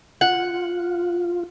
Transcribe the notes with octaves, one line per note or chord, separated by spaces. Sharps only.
F4 F#5